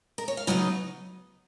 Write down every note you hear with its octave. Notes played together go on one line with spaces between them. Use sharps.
A#4
C#5
F5
C#3 F#3 B3 D#4 D#5